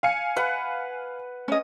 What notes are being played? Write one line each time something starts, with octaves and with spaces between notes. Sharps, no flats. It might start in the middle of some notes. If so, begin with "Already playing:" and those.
F5 G#5 C#7
B4 F#5
C#4 D#5